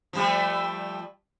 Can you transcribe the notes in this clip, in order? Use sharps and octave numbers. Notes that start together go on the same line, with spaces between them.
F3 G3 A3